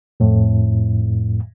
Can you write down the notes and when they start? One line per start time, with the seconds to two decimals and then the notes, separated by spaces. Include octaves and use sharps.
0.20 F2 A2